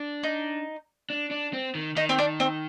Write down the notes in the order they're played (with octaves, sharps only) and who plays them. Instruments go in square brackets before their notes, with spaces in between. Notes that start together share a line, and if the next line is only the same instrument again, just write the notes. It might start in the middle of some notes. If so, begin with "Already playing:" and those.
Already playing: [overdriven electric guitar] D4
[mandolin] D#4
[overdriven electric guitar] D4
D4
C4
D#3
[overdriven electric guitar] D#3 [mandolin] D#4
[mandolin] C4
D4
C4